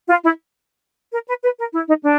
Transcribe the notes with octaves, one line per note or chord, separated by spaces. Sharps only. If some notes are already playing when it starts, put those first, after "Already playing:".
F4
E4
A#4
B4
B4
A#4
E4
D#4
D4